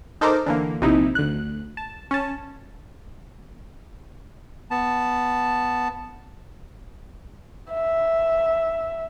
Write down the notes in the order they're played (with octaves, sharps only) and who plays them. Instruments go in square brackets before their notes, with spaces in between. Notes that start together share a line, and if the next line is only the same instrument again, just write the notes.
[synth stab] D#4 A4 A#4 C5 A#5 D6
D3 E3 A#3
A#1 C3 D#4 E4
D2 F#6
A5
C#4 A5
[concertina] B3 A5
[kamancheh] E5